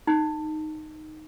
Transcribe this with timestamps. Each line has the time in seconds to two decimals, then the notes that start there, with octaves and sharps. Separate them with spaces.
0.07 D#4